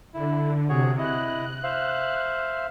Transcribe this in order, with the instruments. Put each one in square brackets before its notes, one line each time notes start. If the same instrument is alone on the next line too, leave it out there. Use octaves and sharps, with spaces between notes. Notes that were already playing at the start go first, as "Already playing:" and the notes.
[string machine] D3 [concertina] E4
[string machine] C3 [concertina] F#4 G#4 C#5
[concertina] E4 D#5 [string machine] F#6
[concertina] C5 E5 F5